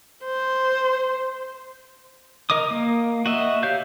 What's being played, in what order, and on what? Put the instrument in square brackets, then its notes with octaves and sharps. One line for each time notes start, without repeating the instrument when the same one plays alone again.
[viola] C5
[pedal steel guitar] A#4 D#5 D6 D#6
A#3
F#4 D#5 E5
G4 C#5 E5 F5 G6